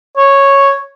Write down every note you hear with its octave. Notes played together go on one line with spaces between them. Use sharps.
C#5